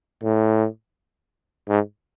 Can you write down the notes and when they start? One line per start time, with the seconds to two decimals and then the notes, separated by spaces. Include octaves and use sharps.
0.23 A2
1.69 G#2